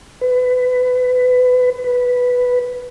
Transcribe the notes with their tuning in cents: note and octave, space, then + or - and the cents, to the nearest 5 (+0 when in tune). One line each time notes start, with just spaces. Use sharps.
B4 +25
B4 +0